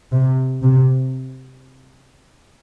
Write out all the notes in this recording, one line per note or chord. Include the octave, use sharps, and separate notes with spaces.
C3
C3